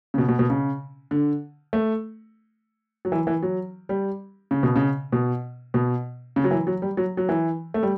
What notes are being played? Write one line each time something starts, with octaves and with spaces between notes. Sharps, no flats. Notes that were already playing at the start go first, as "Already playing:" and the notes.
C#3
B2
B2
B2
C#3
D3
A3
F#3
E3
E3
F#3
G3
C#3
B2
C#3
B2
B2
C#3
F#3
E3
F#3
G3
F#3
F#3
E3
A3
G3